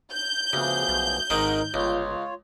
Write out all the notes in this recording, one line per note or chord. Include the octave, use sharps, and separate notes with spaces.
G6
D2 C#3 F3 B3 G#4
B1
G#1 G#2 D#3 D#4 A#4
G1 C#2 F4 C#5